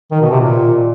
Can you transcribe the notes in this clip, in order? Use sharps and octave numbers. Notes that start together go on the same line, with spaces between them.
D#3
B2
C3
A#2